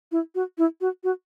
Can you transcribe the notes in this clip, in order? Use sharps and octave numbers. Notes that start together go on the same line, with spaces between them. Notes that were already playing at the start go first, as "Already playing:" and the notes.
E4
F#4
E4
F#4
F#4